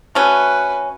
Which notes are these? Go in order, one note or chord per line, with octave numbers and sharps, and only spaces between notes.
A3 C#4 F#4 B4